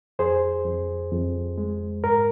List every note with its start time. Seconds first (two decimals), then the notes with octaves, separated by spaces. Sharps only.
0.19 F2 G#4 C5
0.65 F2
1.12 F2
1.58 G#3
2.04 G#2 A#4